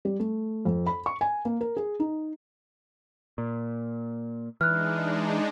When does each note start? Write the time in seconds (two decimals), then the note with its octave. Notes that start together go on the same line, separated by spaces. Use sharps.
0.05 G3
0.20 A3
0.65 F2
0.87 B5
1.06 C#6
1.21 G#5
1.45 A#3
1.61 A#4
1.77 G#4
2.00 D#4
3.38 A#2
4.61 E3 G#3 D4 D#4 F6 F#6